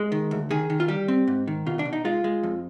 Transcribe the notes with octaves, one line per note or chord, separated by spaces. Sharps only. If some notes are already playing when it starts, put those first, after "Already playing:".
Already playing: G#3
D#3
D2
D#3 G#4
D#3
F4
G3 G4
C4
G#2
D#3
B2 F4
D4
B2
D#4
G#3 F4
G#3
F2